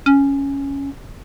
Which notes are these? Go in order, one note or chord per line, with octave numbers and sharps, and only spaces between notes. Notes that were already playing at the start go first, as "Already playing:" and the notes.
C#4